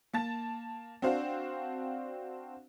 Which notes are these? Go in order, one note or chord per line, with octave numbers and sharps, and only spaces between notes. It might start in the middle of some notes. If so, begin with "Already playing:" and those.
A#3 A5 A6
C4 D4 F#4 C5 F5